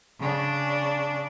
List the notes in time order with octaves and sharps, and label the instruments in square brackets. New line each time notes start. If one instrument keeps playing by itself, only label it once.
[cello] C#3 D4